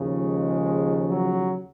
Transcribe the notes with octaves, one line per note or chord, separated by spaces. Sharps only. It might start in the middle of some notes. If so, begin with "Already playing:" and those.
Already playing: D#2 C#3 F3
G#3
F#3